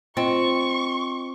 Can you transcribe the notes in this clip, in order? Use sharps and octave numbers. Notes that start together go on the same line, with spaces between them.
C4 F4 D#5 C#6 C#7